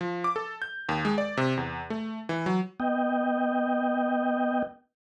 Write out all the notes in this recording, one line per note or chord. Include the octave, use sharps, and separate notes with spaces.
F3
D6
A4
G6
D#2
G#3
D5
C3
E2
A3
E3
F#3
B3 D#5 G5